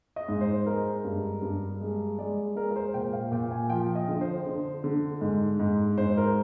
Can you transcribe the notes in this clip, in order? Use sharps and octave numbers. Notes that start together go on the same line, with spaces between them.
D#5
G#2
C5
G#3 A#4
G2
G2
G#3
G#3 D5
G#3 A#4
A#4
C5
A#2 G5
F5
A#2 G5
G#5
F3 G5
D#5
D3
C5
D3
D3
G#2
G#2
G#2 C5
A#4